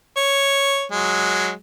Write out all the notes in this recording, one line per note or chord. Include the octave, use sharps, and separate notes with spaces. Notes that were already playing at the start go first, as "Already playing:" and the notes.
C#5
F#3 G#3